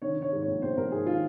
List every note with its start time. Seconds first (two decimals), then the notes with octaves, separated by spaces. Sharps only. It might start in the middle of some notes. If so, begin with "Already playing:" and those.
0.02 D#3 C#5
0.17 D#3
0.22 C#5
0.32 G#2
0.42 C#5
0.47 A#1
0.62 A#1 C5
0.77 A#1 A#4
0.92 G#2 G#4
1.06 D#3 F4